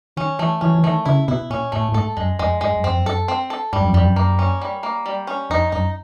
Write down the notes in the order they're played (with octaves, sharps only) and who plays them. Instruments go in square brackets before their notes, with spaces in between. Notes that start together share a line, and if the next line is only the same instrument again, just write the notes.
[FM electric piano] D#3 [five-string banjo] C#4
[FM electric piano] E3 [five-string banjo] A3
[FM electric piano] E3 [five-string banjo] C#4
[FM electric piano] E3
[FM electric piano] D#3 [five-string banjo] A3
[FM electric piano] C#3 [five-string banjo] E4
[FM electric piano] B2 [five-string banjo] E4
[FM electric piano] A#2 [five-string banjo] C#4
[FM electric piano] A2 [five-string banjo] A3
[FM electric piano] A2
[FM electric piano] G#2 [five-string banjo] A4
[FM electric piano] F#2 [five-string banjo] G#3
[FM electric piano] F2 [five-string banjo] G#3
[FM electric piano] G2 [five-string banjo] G#3
[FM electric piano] F#2
[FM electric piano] F2 [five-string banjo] C4
[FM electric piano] F#2
[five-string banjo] A4
C4
A4
[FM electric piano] G2 [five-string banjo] G3
[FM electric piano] F#2
F2
[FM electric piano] F#2 [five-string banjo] G3
[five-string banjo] A#3
C#4
G3
A#3
G3
C#4
[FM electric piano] F2 [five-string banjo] D#4
[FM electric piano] F#2 [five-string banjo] D#4